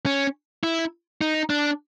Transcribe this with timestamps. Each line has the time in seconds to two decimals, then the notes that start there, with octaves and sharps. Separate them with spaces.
0.06 C#4
0.64 E4
1.21 D#4
1.50 D4